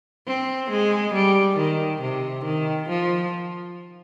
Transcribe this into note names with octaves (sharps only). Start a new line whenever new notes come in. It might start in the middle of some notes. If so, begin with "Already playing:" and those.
C4
G#3
G3
D#3
C3
D#3
F3